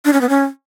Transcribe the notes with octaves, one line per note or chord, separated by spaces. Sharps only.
D4
C#4
B3
C#4